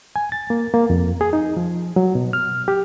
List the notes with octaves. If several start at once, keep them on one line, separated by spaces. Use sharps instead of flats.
G#5
A6
A#3
A#3
F2
G#4
D#4
F3
F#3
B2
F6
G4